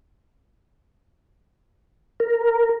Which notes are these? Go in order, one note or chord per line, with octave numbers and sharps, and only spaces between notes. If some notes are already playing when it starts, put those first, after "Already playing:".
A#4